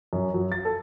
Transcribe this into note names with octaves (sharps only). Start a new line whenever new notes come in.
F#2
F#3
A6
A4